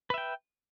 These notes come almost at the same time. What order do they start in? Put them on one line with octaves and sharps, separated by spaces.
B4 E5 G5